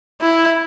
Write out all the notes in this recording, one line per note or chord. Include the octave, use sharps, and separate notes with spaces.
E4